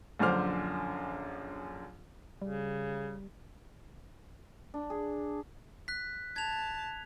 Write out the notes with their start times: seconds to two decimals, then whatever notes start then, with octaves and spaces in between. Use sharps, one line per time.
0.19 A#1 F#2 D3 C5 D6 F6
2.42 C#3 G3
4.74 D4
4.90 G#4
5.88 F#6 B6
6.36 A5 G#6 F7